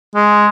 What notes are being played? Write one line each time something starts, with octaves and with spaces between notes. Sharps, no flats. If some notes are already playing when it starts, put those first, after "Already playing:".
G#3